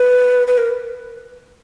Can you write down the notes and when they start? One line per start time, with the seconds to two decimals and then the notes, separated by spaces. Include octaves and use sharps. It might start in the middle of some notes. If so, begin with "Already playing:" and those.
Already playing: B4
0.47 B4
0.58 A#4